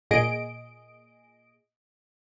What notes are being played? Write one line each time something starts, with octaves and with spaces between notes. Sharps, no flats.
A#2 G#4 D#5 D7